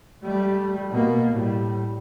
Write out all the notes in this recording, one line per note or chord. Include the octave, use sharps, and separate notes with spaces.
G3 A3
B2 A#3
A2 G3